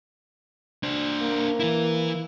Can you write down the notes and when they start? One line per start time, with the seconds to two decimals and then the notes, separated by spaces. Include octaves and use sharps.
0.83 D4 C5
1.21 A#3
1.60 E3 E4